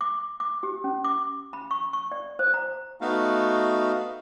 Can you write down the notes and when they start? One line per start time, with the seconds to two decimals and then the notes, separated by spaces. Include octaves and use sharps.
0.01 D6
0.40 D6
0.63 G4
0.84 C#4
1.04 D6
1.53 B5
1.71 C#6
1.93 C#6
2.12 D5
2.39 C5
2.54 A#5
3.01 A3 B3 D#4 F#4 F5